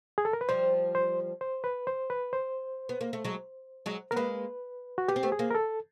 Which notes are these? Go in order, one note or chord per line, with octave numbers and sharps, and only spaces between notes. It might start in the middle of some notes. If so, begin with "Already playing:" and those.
G#4
A4
A#4
B4
F3 G3 C5
C5
C5
B4
C5
B4
C5
B3
A#3
A3
F#3 G#3
F#3 G#3
B3 A#4
G#3 A#3 B4
F#4
B3 G4
C4
A3 B3
G#4
A#3 C4
A#4
A4